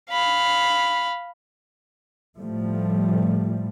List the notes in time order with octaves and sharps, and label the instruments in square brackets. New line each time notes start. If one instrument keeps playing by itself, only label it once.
[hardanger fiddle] F5 B5
[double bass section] A2 F3 G3 A3